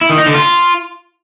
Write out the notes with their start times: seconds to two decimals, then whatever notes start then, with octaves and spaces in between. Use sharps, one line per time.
0.01 E4
0.10 D#3
0.18 D#4
0.26 D3
0.35 F4